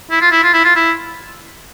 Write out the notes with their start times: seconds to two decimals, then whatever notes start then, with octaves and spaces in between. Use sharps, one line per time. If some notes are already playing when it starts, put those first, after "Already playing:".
0.10 E4
0.21 F4
0.31 E4
0.43 F4
0.53 E4
0.64 F4
0.75 E4